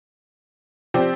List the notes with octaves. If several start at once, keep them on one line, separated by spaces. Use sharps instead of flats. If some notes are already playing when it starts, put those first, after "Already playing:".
F3 C4 G4 D5